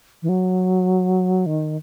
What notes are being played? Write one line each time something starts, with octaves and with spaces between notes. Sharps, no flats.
E3
F#3
D#3